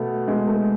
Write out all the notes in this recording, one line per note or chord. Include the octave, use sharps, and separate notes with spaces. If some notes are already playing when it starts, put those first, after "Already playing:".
Already playing: B2 A3 B3
B2 G#3
A3